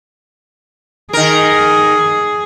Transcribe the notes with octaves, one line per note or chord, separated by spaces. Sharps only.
D#3 G#4 A#4